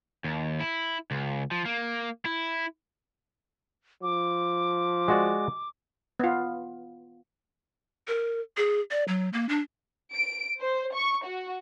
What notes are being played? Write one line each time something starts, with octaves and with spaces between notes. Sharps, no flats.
D#2
E4
C#2
F3
A#3
E4
F3 D6
G#3 F#4 D5
B3 F4
A#4
G#4
D5
F#3
A#3
D4
D7
C5
C#6
F#4